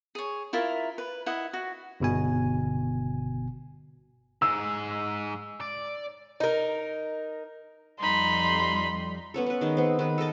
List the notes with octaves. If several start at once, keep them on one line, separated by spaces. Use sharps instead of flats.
G#4 C#5
E4 F4 A#4 E5
B4
E4 D#5 F#5
F#4
G1 B2 G#5
G#2 G#4 E6
D5
D#4 A#4
F2 G3 D#4 B5 C6
B3 C#4 A4
C#4 B4
D#3 G#3 D#4
B3 C4
D#3 B4
A4 A#4 D#5 A5